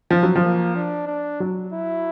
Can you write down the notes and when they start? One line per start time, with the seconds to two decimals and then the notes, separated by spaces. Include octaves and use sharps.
0.10 F3
0.23 F#3
0.36 F3
0.42 A#3
0.75 D4
1.07 D4
1.40 F#3
1.73 E4